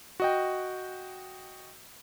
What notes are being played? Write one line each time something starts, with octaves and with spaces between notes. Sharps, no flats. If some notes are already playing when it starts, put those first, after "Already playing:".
F#4 D#5 G5